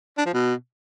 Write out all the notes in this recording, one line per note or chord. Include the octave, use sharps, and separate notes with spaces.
D4
F3
B2